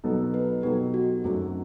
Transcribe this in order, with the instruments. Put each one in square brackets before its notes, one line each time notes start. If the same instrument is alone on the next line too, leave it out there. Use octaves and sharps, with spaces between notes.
[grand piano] B2 F#3 B3 D#4 A4
[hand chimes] B4
[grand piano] B2 F#3 B3 D#4 A4 [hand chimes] G4
[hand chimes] F#4
[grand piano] F#2 F#3 A3 D#4 A4 [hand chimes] C4